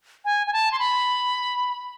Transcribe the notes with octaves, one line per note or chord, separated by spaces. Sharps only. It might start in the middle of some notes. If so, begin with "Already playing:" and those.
G#5
G#5
A5
C6
B5